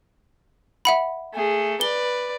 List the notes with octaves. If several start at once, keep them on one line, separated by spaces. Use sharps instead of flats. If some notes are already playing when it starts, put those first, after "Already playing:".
E5 F#5 B5
A3 G#4
B4 D5 G7